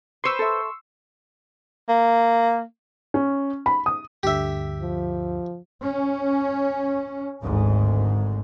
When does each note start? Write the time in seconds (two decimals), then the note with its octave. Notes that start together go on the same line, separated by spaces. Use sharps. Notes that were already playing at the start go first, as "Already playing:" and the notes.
0.24 B4 C5 C6 C#6 E6
0.39 A4 E5
1.89 A#3
3.14 C#4
3.66 B5
3.86 D#6
4.23 D2 G2 D3 G4 E5
4.81 F3
5.82 C#4
7.42 G#1 D2 G#2